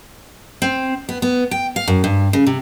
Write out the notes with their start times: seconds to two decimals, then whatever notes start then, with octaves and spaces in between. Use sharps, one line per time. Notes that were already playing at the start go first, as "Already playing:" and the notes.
0.62 C4
1.09 B3
1.22 B3
1.51 G5
1.76 F5
1.88 F#2
2.04 G2
2.33 C#3
2.47 C3